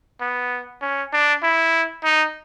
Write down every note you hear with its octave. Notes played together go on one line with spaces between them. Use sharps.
B3
C#4
D4
E4
D#4